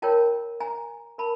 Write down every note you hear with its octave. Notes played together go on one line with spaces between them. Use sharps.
F4 A#4 C#5 G5 A5
G#5 A#5
A#4 A5 B5